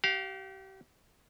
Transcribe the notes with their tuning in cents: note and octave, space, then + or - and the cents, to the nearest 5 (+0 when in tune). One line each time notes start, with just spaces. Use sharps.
G4 -35 F5 +5